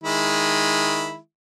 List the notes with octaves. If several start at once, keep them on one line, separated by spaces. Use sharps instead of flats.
D#3 G#3 E4